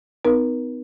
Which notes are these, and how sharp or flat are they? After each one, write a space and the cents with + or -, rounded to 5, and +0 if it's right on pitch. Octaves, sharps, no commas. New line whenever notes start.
B3 +40 D#4 +0 A#4 +45